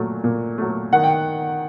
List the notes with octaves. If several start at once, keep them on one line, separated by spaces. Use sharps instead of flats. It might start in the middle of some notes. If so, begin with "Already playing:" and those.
Already playing: A#2 F#3 A3
A#2
F#3 A3
D#3 F#5
G5